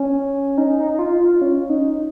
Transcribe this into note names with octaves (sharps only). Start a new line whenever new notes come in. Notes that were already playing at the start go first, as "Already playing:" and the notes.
Already playing: C#4
D#4
D#4
D#4
F4
F4
C#4
D#4